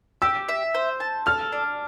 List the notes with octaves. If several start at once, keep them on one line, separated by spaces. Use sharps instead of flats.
G4 E6
E5
C5
A5
A4 F6
D4